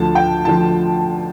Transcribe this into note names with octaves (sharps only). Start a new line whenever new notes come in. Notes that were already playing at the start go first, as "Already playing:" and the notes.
Already playing: D2 D3 F3 A5
G5
D3 F3 A5